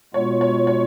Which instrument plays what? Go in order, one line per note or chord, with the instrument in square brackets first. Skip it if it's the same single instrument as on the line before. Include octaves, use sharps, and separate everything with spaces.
[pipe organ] B2 G#3 B3 F4 [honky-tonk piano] C#5
[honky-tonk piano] C#5
C#5